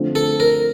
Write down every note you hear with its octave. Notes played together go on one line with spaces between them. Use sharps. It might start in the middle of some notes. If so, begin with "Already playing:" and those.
Already playing: D3 F3 A3 C4
A4
A#4